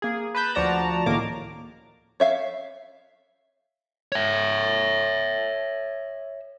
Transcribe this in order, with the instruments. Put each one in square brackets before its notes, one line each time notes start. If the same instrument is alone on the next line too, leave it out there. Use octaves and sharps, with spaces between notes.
[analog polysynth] A#3 G#4
B4 A5 B5 G6
D2 F3 F#4 D5 A5 A#5
C#2 A2 D#3 A#3 A#4 D6
[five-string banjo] C#5 E5 F5
[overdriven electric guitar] C#5 E5